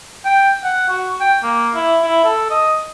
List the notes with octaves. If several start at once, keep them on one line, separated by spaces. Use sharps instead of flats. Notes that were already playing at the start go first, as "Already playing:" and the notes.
G5
F#5
F#4
G5
A#3
E4
E4
A4
D#5